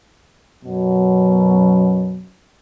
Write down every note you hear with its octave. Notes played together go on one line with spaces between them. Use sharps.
F#2 B2 F#3